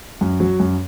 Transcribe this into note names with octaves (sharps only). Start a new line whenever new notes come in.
F#2
F#3
F#2